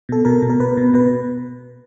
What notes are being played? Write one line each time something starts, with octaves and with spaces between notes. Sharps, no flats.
B2 A4
B2 A#4
B2
A#4
B2 B4
B2
B2 B4